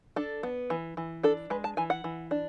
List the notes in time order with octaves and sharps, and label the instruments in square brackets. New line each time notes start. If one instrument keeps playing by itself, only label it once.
[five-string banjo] D4 A4
B3
E3
E3
D4 A4
G#3 B4
A5
E3 G#5
F#5
E3
D4